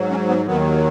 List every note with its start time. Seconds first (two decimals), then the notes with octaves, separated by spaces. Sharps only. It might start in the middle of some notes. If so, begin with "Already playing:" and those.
Already playing: G#2 F#3
0.10 C#4
0.29 B3
0.46 D#2 D#3 F#3 B3